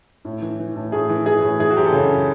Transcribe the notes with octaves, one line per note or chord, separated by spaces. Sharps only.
A2
E3
E3
A2
A2 G#4
E3
E3 G#4
A2
E3 G#4
F#4
F#2 G4
A4
C#3 G#4